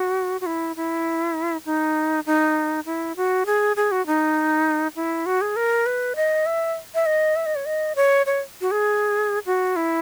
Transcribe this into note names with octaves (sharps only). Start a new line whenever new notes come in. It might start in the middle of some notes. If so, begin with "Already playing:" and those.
Already playing: F#4
F#4
E4
E4
D#4
D#4
E4
F#4
G#4
G#4
F#4
D#4
E4
F#4
G#4
A#4
B4
D#5
E5
E5
D#5
E5
D#5
C#5
D#5
C#5
C#5
F#4
G#4
F#4
E4